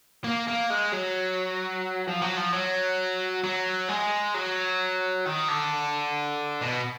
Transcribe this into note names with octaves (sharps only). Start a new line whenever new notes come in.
A#3
A#3
G#3
F#3
F3
F#3
F3
F#3
F#3
G#3
F#3
D#3
D3
B2